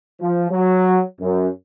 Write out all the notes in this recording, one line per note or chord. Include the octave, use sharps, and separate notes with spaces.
F3
F#3
F#2